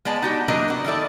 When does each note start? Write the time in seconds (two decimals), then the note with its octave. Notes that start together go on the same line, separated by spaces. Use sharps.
0.05 G#3 B3 D5 A5
0.22 D#4 F#4 G4
0.48 E3 F#3 A#3 D4 A#4 D#5
0.68 B3 F#4
0.84 D#3 C#4 E4 A4 D5